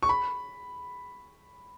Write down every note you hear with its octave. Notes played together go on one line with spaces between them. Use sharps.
C#6
B5